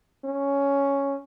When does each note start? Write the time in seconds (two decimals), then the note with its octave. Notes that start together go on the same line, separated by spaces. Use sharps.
0.24 C#4